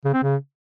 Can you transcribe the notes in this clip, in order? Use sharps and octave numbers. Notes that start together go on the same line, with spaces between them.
C#3
C4
C#3